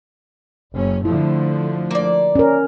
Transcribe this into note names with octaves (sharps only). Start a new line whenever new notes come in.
F#1 C#4
D3 F3 A3 E4
A#3 D5
C#4 A#4